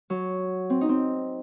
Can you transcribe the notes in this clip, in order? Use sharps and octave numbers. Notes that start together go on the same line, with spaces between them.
F#3
C4
D#4
C4